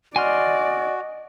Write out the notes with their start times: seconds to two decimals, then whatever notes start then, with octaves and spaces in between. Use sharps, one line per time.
0.16 F#4 D5 D#5 G#5 C6 F6